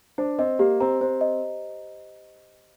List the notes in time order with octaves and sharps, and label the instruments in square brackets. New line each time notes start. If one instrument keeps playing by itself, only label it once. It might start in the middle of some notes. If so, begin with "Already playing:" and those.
[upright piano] D4 [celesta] C5
[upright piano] C4 [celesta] D#5
[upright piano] A#3 [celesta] G4
[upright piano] C4 [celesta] A#5
[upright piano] C4 [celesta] C5
[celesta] D#5